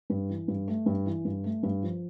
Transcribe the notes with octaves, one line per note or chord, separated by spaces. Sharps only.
G2
E3
G2
A3
G2
E3
G2
A3
G2
F3